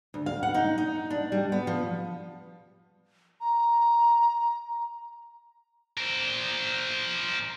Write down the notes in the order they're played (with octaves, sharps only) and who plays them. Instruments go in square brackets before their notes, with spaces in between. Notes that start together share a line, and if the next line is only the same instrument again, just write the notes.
[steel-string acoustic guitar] D2
F5
F#5
D#4
D#4
D4
G3
B3
F3
[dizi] A#5
[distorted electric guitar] A#4 C5